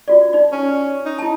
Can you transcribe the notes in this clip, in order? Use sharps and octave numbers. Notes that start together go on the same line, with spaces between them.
F4 F#4 D5
D#4 D5
C#4
D#4
E4 A5